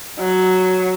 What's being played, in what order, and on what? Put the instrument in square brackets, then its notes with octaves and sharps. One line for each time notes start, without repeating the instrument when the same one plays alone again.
[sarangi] F#3